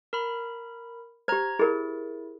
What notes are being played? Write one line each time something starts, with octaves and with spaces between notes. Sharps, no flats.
A#4 B5
G4 C5 A#5 G#6
E4 G#4 A#4